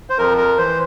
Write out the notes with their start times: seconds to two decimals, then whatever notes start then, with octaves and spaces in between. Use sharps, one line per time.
0.10 C5
0.18 F2 A#4
0.38 A#4
0.58 E3 C5